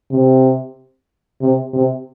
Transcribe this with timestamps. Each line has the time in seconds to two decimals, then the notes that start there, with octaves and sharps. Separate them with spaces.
0.11 C3
1.41 C3
1.74 C3